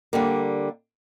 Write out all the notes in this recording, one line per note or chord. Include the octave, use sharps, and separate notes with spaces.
D3 G3 A#3